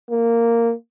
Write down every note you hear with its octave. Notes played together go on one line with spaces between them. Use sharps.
A#3